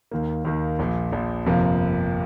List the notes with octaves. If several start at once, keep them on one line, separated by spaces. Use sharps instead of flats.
D#2 D#3 A#3
D#2 D#3 A#3
A#1 A#2 F3
A#1 A#2 F3
G1 F2 C3 F3 A#3